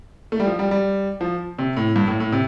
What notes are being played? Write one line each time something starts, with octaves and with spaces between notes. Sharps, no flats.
A3
G3
F3
G3
G3
F3
C3
A2
G2
A2
A2
C3